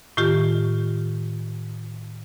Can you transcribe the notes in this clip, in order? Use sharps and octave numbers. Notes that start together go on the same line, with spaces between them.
A2 D#3 F4 G4